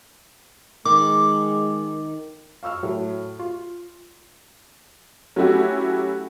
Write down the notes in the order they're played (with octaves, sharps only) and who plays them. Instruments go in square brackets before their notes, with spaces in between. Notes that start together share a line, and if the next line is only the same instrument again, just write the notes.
[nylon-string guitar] D#3 [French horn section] G#3 [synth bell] D6
[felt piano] F5 C#6 E6 F6
A2 F#3
F4
[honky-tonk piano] F#3 A3 C#4 E4 F#4 G4